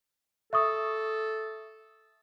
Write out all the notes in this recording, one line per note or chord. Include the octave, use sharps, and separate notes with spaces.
A4 E5 C#6 D#6